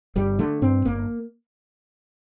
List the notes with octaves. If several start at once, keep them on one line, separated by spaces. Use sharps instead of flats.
G1 G3
D3 A3
G2 C4
G1 A#3